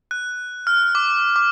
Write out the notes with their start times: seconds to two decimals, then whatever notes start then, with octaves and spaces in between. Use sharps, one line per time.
0.11 F#6
0.67 F6
0.95 D6
1.36 D6